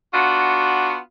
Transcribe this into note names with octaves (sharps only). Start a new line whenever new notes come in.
B3 D4 F4 F#4